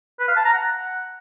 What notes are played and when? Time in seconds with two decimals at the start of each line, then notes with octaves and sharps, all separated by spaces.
0.19 B4
0.28 F5
0.37 A5
0.45 A#5
0.54 F#5